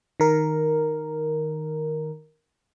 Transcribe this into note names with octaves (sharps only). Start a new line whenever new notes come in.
D#3 A#4